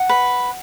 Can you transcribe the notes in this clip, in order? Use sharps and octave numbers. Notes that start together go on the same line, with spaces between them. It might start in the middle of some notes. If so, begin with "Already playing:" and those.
Already playing: F#5
B4